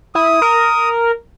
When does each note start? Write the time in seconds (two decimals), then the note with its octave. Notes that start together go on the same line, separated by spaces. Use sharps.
0.15 E4 D#6
0.42 A#4